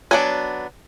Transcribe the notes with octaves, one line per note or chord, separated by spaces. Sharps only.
F#3 B3 D4 G#5